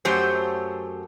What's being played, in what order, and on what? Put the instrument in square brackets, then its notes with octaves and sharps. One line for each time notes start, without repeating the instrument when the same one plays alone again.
[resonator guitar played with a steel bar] F#2 F#3 A3 G4 C5